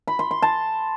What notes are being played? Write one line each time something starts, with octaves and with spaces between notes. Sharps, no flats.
B5
C6
C6
A5